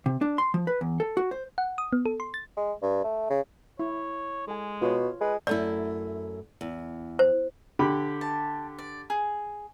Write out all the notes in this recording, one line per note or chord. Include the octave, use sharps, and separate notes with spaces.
C3
D4
C6
F3
B4
E2
A4
F#4
C5
F#5
D#6
B3
A4
C6
A6
G#3
G2
A3
C#3
E4 C#5
G#3 A4 G#5
B2 F4 C#5
G#3 B4
F#2 A3 E4 D5
E2
C5
D3 G4 B5
A5
D5
G#4